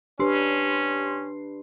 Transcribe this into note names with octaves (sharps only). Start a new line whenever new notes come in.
C#4 D4 G4 B4 C6 C7